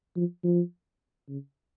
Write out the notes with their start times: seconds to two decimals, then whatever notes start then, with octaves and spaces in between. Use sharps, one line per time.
0.16 F3
0.44 F3
1.29 C#3